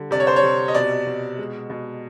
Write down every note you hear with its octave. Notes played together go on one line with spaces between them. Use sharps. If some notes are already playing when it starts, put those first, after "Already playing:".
Already playing: D3 G3
C3 D5
C#5
C5
C#5
C3
D#5
B2 D5
B2
G#3
B2